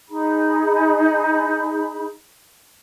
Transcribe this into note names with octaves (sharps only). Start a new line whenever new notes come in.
D#4 G#4 B5